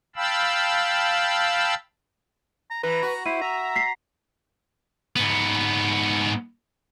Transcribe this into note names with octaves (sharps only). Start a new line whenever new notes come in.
F5 G5 A5 B5 E6
A#5
E3 B4 A#5
F#4
E4 C5 D#7
E5 A#5
B6 C7
G#2 B3